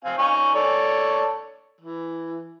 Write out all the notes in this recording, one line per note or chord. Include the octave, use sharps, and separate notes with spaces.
C4 F5 G#5
D#4 G#5 C#6
A4 C#5 D5
E3